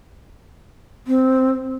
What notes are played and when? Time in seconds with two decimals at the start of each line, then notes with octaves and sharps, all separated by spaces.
1.07 C4